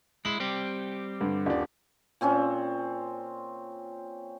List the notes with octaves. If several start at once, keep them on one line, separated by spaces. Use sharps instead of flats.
G#3 E4 F#7
G3 C4 G4
G2 D3
D#1 D4
A#2 C4 C#4 F4